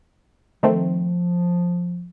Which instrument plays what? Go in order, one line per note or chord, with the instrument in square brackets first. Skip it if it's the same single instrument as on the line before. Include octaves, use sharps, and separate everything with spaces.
[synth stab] D#3 A3 C4 [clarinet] F3